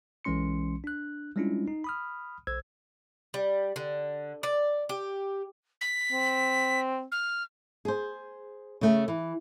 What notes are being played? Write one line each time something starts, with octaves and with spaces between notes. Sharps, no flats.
B1 E3 G#3 C#4 C6 C#7
D4 F#6
G3 G#3 C#4 D4 E4 F4
D#4
B5 D#6 F6
B1 C5 E6 G#6
G3
D3
D5
G4
B6
C4
F6
G#4 C5
C#3 A3
E3